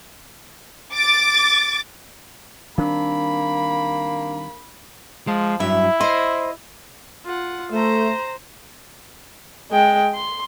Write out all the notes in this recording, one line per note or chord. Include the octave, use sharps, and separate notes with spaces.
D6 A6
D#3 G3 A#3 C4 D4 B5
F3 G#3
G2 F#3 E4 E5
C5 D#5 C6
F4 F#5
A3 C5 A#5
G#3 G5
C6